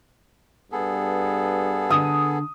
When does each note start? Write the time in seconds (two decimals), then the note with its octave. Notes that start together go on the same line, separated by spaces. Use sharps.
0.72 G2 B3 G#4 A4
1.91 D3 D#6